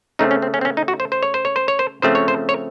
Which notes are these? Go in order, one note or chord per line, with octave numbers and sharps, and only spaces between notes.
C#3 A3 C4 D#4
C#4
C4
C#4
C4
C#4
D#4
F#4
C5
C5
C#5
C5
C#5
C5
C#5
C5
C#3 F3 A3 C4 C5
C#5
C5
C#5